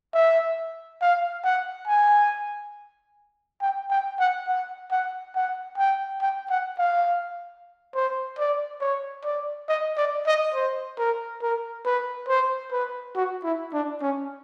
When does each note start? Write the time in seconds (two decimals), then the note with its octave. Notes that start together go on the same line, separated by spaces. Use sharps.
0.14 E5
1.01 F5
1.44 F#5
1.88 G#5
3.62 G5
3.91 G5
4.20 F#5
4.48 F#5
4.91 F#5
5.35 F#5
5.78 G5
6.21 G5
6.50 F#5
6.79 F5
7.95 C5
8.38 D5
8.81 C#5
9.24 D5
9.69 D#5
9.97 D5
10.26 D#5
10.54 C5
10.98 A#4
11.42 A#4
11.85 B4
12.28 C5
12.71 B4
13.15 F#4
13.44 E4
13.73 D4
14.02 C#4